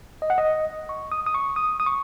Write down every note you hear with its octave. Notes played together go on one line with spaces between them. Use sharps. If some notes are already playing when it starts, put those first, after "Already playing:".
D#5
F#5
D#5
C#6
D#6
D#6
C#6
D#6
D#6
C#6